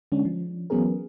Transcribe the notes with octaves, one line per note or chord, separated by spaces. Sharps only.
D3 G#3 C#4 D4
F3
E3 F#3 B3 C#4 G#4 A#4